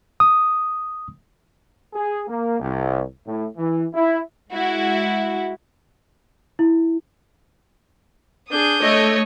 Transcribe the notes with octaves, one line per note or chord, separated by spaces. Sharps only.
D#6
G#4
A#3
C2
A2
E3
E4
G#3 E4 F#4
E4
D4 G#4 D#6 G6
A3 C#5 D#5